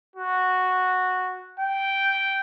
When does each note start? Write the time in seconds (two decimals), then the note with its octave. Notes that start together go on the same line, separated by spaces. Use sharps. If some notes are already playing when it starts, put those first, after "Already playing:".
0.16 F#4
1.60 G5